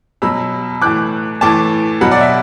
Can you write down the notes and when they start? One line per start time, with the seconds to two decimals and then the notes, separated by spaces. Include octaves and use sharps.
0.22 B2 F#3 B5 E6
0.82 A2 E3 D6 F#6
1.41 A2 E3 A5 D6
2.01 B2 F#3 F#5 B5
2.11 D5 F#5
2.21 E5